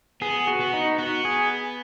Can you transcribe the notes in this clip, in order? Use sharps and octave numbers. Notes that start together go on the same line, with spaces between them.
B3 G#4
F#4
B3
D#4
B3 F#4
G#4